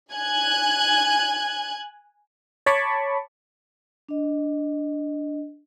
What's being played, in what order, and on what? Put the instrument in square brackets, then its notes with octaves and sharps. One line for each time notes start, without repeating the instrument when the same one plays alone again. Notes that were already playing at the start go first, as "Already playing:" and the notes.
[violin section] G#5 F#6 G#6
[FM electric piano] C#5 A5 B5 C#6 D6
[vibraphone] D4 D#5